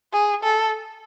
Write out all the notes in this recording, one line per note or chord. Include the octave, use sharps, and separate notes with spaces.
G#4
A4